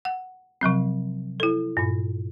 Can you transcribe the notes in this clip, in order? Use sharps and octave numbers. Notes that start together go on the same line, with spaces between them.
F#5
C3 F3 F#3 C4
E4 A4
G2 A#2